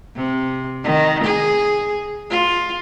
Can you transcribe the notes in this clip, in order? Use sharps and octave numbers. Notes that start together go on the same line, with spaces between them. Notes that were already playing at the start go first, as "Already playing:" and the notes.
C3
D#3
G#4
F4